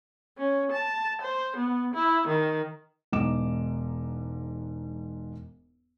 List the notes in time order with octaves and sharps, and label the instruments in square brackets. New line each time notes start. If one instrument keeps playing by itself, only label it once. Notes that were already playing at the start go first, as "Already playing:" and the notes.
[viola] C#4
A5
C5
B3
E4
D#3
[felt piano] E1 G#2 D#4 D6 E7